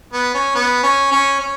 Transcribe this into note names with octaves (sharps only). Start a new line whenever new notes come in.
B3
C#4
B3
C#4
C#4
C#4